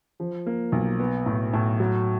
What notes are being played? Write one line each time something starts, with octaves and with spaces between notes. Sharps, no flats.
F3
A#3
B1
B3
A2
A2
F#3